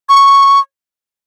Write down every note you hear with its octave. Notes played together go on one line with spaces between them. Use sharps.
C#6